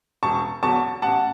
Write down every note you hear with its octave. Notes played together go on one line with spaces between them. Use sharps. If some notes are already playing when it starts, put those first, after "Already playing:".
E1 A5 C#6
E2 D3 F#3 A5 C#6
A1 F#5 A5